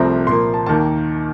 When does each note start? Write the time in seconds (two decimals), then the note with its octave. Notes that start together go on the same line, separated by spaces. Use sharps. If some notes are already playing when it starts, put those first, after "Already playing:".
Already playing: C2 C3 F3 A3 C4 A#5
0.27 A#2 F3 A#3 C6
0.54 A5
0.66 D#2 D#3 A#3 A5